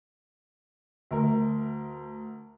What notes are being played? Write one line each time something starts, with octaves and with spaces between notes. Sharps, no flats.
D2 A#4